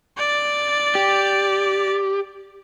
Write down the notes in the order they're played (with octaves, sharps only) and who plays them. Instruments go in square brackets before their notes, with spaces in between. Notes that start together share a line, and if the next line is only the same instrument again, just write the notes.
[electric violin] D5 A6
[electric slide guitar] G4